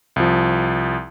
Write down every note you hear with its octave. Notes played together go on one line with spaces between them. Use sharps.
C2 F3